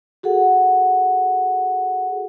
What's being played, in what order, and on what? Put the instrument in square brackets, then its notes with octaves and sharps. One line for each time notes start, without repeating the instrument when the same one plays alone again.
[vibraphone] F#4 G#4 A4 F#5